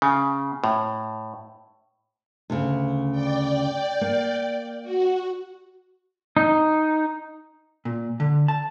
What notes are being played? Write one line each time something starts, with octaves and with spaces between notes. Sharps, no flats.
C#3
A2
D2 C#3
D5 G5
A#3
F#4
D#4
A#2
D3
A5